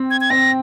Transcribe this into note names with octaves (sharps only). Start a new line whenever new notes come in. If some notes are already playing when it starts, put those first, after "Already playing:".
Already playing: C4
G#6
G#6
C4 A#6